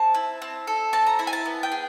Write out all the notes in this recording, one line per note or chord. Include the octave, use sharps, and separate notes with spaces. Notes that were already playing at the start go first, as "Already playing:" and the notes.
Already playing: C4 A5
E4
C4
A4
C4 A5
A#5
E4 B5
G#5
A5
B3
G5
G#4